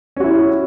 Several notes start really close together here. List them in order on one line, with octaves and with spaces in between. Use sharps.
C#4 F#4 E4